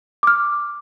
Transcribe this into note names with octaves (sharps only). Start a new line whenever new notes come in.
D6 F6